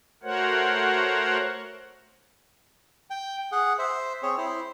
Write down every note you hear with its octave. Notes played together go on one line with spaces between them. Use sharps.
A3 F#4 A#4 C5 C#5 F#5
G5
G#4 F#5
C5 E5
C4 G#4 C#5
E4 C5